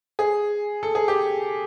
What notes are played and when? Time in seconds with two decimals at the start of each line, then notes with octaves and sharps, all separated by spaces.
0.19 G#4
0.83 A4
0.95 G#4
1.08 G4